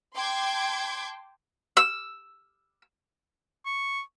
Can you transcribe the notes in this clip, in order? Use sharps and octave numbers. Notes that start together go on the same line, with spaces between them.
G5 A5 C6 D6 G6 G#6
E6
C#6